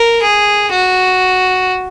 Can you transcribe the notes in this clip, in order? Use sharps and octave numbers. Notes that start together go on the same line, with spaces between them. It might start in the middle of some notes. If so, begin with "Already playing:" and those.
Already playing: A#4
G#4
F#4